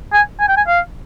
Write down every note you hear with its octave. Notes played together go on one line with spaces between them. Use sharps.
G#5
G#5
G5
G#5
F5